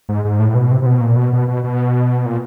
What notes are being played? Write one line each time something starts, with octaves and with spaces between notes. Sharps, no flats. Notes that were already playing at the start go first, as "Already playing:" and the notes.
G#2
G#2
A2
B2
C3
C3
B2
A#2
B2
B2
B2
B2
A#2